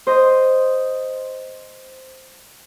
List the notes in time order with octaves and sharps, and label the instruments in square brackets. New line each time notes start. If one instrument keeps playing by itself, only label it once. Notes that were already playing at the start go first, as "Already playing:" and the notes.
[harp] C5 D#5